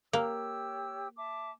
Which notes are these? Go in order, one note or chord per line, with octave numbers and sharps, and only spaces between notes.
A#3 G4 C#5 E6
E5 A5 D6